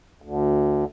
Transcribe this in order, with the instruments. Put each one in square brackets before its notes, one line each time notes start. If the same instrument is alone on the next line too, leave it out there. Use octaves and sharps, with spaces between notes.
[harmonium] D2